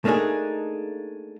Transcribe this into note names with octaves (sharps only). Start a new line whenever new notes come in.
A3 A#3 D4 D#4 G#4